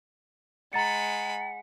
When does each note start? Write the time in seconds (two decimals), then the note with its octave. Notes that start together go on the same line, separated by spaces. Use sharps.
0.73 G#3 F#5 A#5 B5 A6 C#7